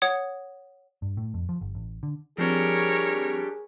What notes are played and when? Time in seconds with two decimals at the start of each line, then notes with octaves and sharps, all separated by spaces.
0.02 C#5 F#5 D#6 G#6
1.02 G2
1.17 A2
1.34 F2
1.49 F3
1.61 G1
1.75 A1
2.03 D3
2.38 F3 G3 C4 D4 G4 G#4 A#4 C#5